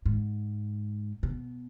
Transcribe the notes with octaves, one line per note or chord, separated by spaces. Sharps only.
G#2
B2